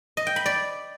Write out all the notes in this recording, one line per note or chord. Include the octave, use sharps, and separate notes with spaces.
D#5
G5
B5
D5